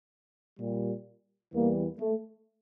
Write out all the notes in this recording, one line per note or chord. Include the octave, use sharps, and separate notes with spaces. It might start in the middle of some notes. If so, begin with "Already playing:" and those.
A#2 G3
E2 E3 G3 A#3
A3